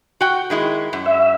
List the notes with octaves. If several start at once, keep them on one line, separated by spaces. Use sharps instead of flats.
F#4 G5
D#3 G#3 E4
F#2
E5